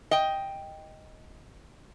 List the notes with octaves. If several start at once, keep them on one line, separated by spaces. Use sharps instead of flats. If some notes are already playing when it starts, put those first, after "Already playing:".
D#5 G5